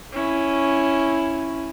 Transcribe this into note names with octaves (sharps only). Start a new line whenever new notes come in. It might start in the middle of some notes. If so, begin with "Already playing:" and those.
C#4 E4